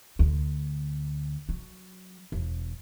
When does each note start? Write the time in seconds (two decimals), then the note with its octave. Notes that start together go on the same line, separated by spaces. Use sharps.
0.19 D2
1.49 F#3
2.32 E1